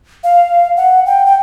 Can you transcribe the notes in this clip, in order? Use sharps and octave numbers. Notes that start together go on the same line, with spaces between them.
F5
F#5
G5
G5